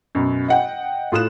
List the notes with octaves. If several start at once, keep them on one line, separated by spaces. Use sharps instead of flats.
F#2 B2
D#5 F#5 G5
A2 F4 D#6 F#6 E7